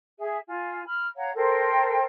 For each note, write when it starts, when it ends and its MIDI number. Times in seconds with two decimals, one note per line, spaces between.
0.19 0.38 68
0.19 0.38 76
0.48 0.84 65
0.48 0.84 80
0.86 1.06 83
0.86 1.06 89
1.16 1.31 73
1.16 1.31 77
1.16 1.31 78
1.16 1.31 82
1.35 2.06 69
1.35 2.06 70
1.35 2.06 72
1.35 2.06 79